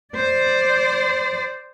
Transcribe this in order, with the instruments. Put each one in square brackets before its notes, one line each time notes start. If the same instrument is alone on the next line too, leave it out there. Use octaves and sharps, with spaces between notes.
[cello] C5 D5